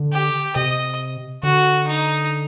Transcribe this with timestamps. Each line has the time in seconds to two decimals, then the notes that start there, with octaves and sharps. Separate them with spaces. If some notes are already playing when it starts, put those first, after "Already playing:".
Already playing: D3
0.13 G4
0.56 C3 D#5
1.43 D3 F#4
1.87 D#4